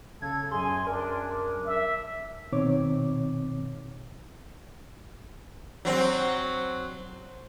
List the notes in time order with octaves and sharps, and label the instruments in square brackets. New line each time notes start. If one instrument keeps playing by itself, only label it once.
[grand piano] C#3 [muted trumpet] A4 [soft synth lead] G#6
[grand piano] F#2 G#4 [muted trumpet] G#5 [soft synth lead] C6
[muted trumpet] D4 [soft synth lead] A#4
[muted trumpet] E5
[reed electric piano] B2 D#3 C4 D#4 C#5 D6
[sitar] F#3 C4